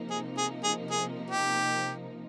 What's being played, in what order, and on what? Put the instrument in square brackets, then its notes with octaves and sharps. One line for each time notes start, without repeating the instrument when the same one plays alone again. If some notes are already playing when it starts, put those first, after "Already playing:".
Already playing: [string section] C3 F3 A#3 D#4
[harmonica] G#4
G#4
G#4
G#4
G4